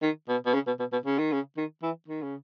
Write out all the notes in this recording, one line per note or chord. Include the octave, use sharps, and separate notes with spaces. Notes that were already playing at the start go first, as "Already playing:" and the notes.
D#3
B2
B2
C#3
B2
B2
B2
C#3
D#3
C#3
D#3
E3
D#3
C#3